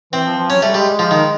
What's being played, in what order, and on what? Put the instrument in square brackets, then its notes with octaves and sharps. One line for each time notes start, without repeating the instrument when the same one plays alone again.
[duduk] E3 [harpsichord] C4
[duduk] F3
F3
[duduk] F#3 [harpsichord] C#4
[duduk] G3 [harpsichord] A3
[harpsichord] G3 [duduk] G#3
[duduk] G#3
[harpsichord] F3
D#3